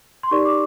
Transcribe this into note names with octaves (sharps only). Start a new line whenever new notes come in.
C6
D#4 G4 A#4 D5 C#6
D6